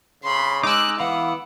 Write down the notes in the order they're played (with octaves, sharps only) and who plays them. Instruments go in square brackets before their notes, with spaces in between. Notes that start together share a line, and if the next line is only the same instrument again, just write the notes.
[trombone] C#3 [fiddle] B5 C6
[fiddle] G#3 F#6 [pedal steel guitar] D#4 G#5 [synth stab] D6 E6
[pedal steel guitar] E3 F5 B5 [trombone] B3 [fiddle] F#5